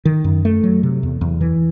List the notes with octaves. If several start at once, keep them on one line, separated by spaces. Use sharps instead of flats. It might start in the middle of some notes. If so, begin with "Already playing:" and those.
D#3
F#2
A3
F#3
C3
E2
E2
E3